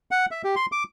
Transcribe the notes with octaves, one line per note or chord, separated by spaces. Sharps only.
F#5
E5
G4
C6
D6